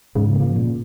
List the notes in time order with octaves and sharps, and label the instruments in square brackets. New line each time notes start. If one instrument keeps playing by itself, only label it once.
[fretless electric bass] G#2 [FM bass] C#3
[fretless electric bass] F3 A#3
A#2